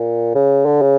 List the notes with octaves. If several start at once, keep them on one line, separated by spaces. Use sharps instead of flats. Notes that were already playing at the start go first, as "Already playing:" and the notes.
Already playing: A#2
C#3
D3
C#3